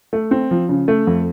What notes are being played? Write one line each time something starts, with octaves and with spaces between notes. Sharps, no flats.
A3
C4
F3
C#3
A3
F2